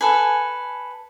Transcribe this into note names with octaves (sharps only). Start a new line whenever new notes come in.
A4 B4 G#5